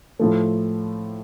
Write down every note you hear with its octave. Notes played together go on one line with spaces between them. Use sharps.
A2 F3 A3